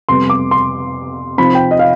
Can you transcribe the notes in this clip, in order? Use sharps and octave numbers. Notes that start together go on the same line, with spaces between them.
F2 C3 G3 B3 C6
D6
C6
C3 F3 C4 D#4 B5
G5
D#5
F5